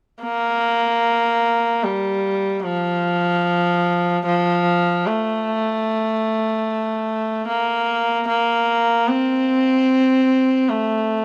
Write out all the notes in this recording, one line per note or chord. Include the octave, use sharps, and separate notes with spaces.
A#3
G3
F3
F3
A3
A#3
A#3
C4
A3